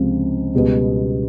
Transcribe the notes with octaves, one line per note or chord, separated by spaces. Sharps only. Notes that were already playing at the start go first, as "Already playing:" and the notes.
Already playing: C#2 C3 F3 G#3 C4
C#2 B2 G3 B3